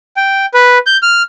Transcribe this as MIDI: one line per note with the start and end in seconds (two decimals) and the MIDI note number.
0.17 0.46 79
0.54 0.78 71
0.86 0.97 91
1.03 1.22 89